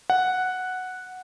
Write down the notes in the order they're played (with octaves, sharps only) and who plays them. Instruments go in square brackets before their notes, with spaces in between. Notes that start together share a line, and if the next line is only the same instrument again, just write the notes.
[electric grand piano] F#5